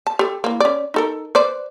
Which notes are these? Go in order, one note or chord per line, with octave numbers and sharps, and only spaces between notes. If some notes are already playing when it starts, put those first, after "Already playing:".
A5
G4 A4
E3 A#3
C#4 D5
D#4 A4 A#4
B4 C5 D5